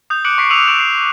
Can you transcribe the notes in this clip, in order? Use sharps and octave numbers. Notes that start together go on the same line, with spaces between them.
D#6 G6
D6 F#6 C#7 D7 F#7
C#6 B6 C7 D7
D6 E6 C#7 D#7 F7 F#7
C#6 F#6 D7 E7 F#7
C7